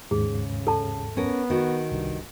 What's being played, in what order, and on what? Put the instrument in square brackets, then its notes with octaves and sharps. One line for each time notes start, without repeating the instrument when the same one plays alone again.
[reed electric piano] D#2 G#2 [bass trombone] C#3 [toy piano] G#4
[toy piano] A4 A5
[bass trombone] B3 [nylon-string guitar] C#4 A#4
[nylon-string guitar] D#3 F#4
[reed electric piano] C2 [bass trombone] G2